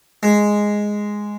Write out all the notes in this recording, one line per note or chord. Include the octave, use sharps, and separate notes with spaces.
G#3